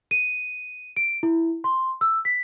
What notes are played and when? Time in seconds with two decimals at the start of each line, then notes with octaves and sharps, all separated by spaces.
0.11 D#7
0.97 D7
1.23 E4
1.64 C6
2.01 E6
2.25 B6